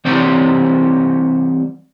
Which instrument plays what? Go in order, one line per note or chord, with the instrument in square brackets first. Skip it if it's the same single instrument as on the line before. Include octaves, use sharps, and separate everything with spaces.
[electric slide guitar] E3 G3 C4 F#4 C5 D5